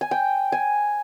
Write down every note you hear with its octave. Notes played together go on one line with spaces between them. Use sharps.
G#5
G5
G#5